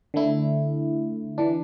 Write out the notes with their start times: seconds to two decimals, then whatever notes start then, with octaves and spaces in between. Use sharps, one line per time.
0.14 D3 A3 E4
1.38 E3 D4